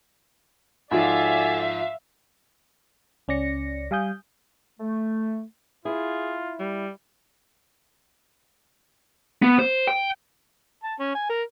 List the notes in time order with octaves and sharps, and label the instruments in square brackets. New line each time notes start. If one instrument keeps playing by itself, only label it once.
[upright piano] G#2 F3 [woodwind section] F#4 A4 D5 [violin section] E5 F5 [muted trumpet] G#5
[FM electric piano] C#2 C#4 D5 A#6 C#7
G3 F5 G#5 D#6 G6
[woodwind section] A3
[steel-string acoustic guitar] E4 [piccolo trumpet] F4 [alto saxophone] G#4
[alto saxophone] G3
[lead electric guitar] B3
C5
G5
[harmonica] A5
C#4
G#5
A#4